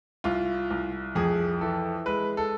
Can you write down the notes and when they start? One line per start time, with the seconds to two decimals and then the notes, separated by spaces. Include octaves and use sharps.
0.24 C2 F4
0.71 C2
1.15 F2 G#4
1.61 E3 A4
2.06 G#3 B4
2.37 A4